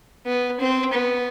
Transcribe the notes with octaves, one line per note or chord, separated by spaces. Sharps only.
B3
C4
B3